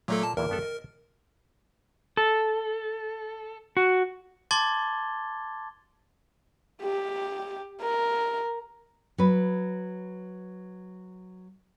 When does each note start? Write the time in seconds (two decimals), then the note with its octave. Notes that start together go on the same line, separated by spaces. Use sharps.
0.08 A#2 F#3 A3 A#3 A4
0.23 A5
0.37 E2 A#2 E3 A#4
0.49 G2 B3 A4
0.62 D#5
2.17 A4
3.77 F#4
4.51 A5 C6 D6 G#6 A6 G7
6.82 G4
7.83 A#4
9.18 F#3 B4